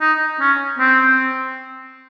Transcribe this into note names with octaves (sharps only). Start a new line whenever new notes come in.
D#4
C#4
C4